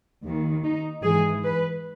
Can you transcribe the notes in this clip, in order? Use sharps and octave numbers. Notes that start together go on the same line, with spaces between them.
D#2 D#3
D#4
G#2 E3 G#4
B4